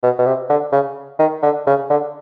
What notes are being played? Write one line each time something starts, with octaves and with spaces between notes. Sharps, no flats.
B2
B2
C3
D3
C#3
D#3
D3
C#3
D3